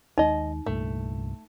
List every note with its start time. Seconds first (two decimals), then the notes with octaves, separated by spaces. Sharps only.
0.18 D#2 G#3 D#4 D#5 G#5
0.66 C2 G2 A#2 A3